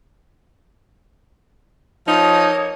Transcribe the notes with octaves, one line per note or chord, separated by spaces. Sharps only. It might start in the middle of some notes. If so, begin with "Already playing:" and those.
F3 A#3 D#4 A4 C#5 D#6